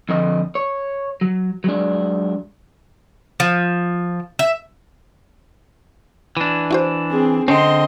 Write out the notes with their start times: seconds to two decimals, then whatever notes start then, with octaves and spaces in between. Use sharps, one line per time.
0.09 F2 D3 D#5
0.55 C#5
1.21 F#3
1.64 F#3 G#3 D4
3.40 F3
4.39 E5
6.37 E3 D4
6.71 E4 F#4 C5
7.09 C4 G#4
7.48 D3 C4 C#4 D#5 C6